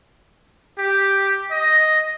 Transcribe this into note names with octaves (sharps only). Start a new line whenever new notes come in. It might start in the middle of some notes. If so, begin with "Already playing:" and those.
G4
D#5